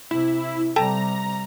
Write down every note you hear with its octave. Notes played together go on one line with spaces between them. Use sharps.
C3 E4
C3 G3 A4 G5 A5 A#5